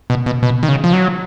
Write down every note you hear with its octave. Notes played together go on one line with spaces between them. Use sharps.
B2
B2
B2
D#3
C#3
F3
F#3